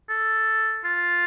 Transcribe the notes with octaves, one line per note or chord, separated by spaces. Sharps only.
A4
F4